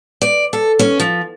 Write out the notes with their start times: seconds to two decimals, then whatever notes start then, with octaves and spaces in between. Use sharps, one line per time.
0.22 D5
0.53 A4
0.79 C#4
1.00 F3